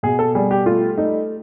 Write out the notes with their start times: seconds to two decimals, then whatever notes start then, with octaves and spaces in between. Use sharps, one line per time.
0.03 B2 G#4
0.19 A4
0.35 G3 G#4
0.51 G4
0.66 A3 F4
0.98 A3 D#4